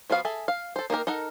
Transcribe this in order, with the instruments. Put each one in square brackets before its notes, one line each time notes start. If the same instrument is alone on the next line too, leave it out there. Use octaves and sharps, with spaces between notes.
[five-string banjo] F3 B3 F#4 F5
G#4 A4 E5
F5
A4 C5
A#3 D#4 G4 A#4
D#4 A4 A#4 F#5